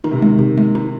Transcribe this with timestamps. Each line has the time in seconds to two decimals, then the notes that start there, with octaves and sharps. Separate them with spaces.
0.04 D#3 D#4
0.11 C3
0.20 D#3 G#3
0.39 C3
0.58 G#3
0.75 D#4